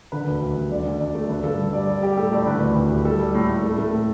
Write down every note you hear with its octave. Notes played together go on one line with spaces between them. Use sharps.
D3 B4
D2
D2
G3
D3 D5
D2
D2 D5
A3
D3 B4
G2 A4
G2
G3 D5
G3 D5
G3 G4
A2 A4
A2 D5
D3 B4
D2
D2
G3
G3 A4
G3
A2
A2
A3
A3
A2